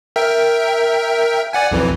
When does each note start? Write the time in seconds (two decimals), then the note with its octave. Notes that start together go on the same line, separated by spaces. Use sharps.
0.16 A#4 E5 G5
1.53 D5 F#5 G#5
1.71 B1 F2 E3